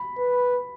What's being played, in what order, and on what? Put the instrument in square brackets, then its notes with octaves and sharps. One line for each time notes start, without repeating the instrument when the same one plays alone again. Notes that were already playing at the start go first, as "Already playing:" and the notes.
Already playing: [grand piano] B5
[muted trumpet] B4